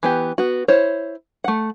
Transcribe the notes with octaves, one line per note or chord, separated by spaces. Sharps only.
E3 B3 G4
B3 F#4
E4 C5 C#5
A3 F#5